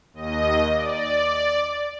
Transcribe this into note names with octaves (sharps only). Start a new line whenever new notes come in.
D#2 D#5
D5